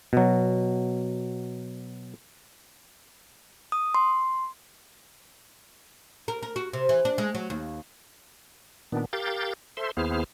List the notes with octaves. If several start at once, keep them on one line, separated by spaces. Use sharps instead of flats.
B2 F#3
D#6
C6
A#4
A#4
F#4
C3
E3
D4
G#3
F#3
D#2
A#2 D#3 B3 D4
G4 A#4 F5 G6 A6
A4 C5 E5 C6
D#2 B3 E4 G#4 C5 F6